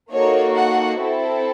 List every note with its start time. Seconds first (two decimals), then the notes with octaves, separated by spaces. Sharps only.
0.12 A#3 D#4 F#4 A4 C#5
0.56 F#5
0.99 C4 E4 A4